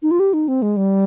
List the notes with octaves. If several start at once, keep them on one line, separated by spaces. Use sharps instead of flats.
D#4
F4
G4
D#4
C4
G#3
G3